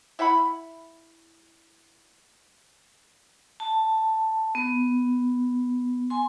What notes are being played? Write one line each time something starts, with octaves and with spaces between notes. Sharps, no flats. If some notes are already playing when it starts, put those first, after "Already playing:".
E4 E5 F#5 B5
A5
B3
G#5 C6